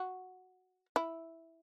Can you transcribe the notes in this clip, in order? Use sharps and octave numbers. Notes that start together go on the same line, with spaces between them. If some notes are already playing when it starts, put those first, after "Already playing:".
Already playing: F#4
E4